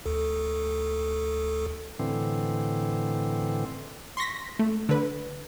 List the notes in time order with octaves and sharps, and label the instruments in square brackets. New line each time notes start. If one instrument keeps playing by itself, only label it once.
[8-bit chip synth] D2 A4
[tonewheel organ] A2 D3 E3 C4
[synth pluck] C6 C#6 A#6 B6
A3
D3 B4